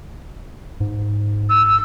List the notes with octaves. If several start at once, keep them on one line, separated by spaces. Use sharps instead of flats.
G#2
E6